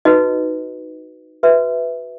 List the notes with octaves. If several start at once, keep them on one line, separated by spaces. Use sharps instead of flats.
D#4 F#4 B4 D#5
F#4 B4 E5